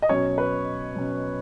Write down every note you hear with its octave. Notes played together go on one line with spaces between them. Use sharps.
D#5
B2 F#3 C#4 C#5
B4
B2 F#3 C#4